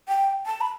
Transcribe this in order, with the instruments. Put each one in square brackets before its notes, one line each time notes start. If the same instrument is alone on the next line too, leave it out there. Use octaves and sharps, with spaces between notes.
[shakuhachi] G5
A5
B5